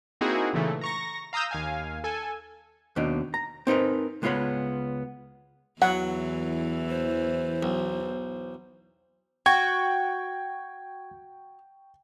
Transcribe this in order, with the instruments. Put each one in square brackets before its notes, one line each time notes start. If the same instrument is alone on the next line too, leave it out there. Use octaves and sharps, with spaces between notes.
[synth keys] A#3 C4 D#4 E4 F#4 G#4
A#2 C#3 E3 A3
A#5 C#6 A#6
F5 A#5 D#6 E6 G6
D#2 F5 G#5
A4 G#5
[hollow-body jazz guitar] D#2 B2 D4 D#4
A#5
C4 D#4 A#4 B4
C#2 G#3 B3 F4 C#5 B5
[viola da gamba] E2 E3 [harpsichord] F#3 [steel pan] F#5
[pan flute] C5
[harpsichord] B1
[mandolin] F#4 [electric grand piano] G5 C#6 [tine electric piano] G#6